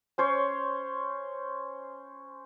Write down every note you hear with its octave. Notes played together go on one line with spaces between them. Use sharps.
C#4 C5 C#5